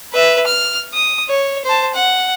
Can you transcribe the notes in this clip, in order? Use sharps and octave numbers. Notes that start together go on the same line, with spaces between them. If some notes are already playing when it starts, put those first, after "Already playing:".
B4 E5
F6
D#6
C#5
C5 A5
F#5